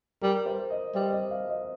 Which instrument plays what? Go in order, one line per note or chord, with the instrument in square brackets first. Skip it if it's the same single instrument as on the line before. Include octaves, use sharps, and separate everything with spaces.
[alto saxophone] G3 [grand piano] A#4
[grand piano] C5
D#5
[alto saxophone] G3 [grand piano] C5
[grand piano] D#5
F5
D#5